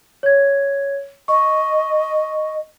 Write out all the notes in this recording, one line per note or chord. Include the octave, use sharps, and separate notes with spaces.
C#5 G#6
D#5 C#6